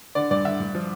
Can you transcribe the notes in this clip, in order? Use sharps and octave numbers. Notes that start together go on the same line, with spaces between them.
D3 D5
G2 D5
D3 E5
G2
F3